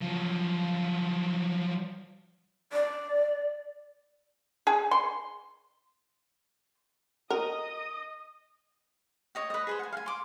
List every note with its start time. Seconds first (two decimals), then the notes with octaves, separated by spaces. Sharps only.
0.01 F3 F#3
2.73 D5
4.67 G#4
4.91 C6
7.30 A#4 D#5 D#6
9.35 C#5 D#5 G5
9.50 B4 D#5
9.67 G#4 B4 C5
9.79 F#5 G#5
9.92 F5 G#5
10.06 C6 D6